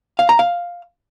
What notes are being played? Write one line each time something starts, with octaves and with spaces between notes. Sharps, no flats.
F5
A#5
F5